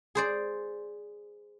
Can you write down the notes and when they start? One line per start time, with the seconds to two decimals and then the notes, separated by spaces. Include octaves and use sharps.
0.15 G#4 C5 D5